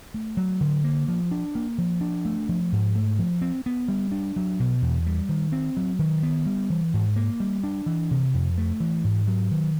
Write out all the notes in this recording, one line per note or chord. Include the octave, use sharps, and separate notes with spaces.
A3
F#3
D3
A#3
F3
D4
A#3
F3
D4
A3
F3
G#2
A3
F3
C4
B3
G3
D4
F#3
B2
E2
G3
D#3
C4
F#3
D#3
B3
G3
E3
G#2
A#3
G3
D4
E3
C3
F2
A3
E3
G#2
F#3
D#3